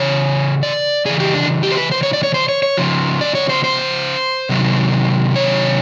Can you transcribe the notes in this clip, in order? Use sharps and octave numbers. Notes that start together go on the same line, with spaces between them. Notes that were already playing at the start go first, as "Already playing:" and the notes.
Already playing: C#3 E3 C#5
D5
C#3 E3 G#4
G4
D4
G4
C5
B4
C5
C#5
D5
C#5
C5
C#5
C#5
C#3 F3
D5
C#5
C5
C5
C3 D#3 F#3
C#5